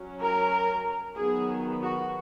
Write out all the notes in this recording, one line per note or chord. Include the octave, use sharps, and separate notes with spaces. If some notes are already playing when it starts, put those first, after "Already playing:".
Already playing: F#3 C#4
A#4
D#3 F#3 B3 G#4
F#4